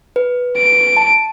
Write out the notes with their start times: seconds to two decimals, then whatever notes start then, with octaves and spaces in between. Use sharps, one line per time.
0.16 B4
0.58 D7
0.97 A5